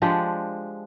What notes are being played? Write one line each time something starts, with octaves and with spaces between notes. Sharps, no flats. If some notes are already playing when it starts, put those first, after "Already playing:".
F3 G#3 D4 G4